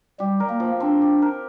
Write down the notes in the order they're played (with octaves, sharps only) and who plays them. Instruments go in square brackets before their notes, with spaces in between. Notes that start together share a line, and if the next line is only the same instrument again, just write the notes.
[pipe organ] G3 [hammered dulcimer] G4
[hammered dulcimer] A#4
[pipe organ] A#3
[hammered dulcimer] F3
[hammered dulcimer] C4 [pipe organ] D4
[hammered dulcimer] G4
A#4